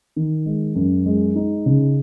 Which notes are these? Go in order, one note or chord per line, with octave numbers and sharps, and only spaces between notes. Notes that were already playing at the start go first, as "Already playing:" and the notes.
D#3
G#3
F#2
G#3
D#4
C#3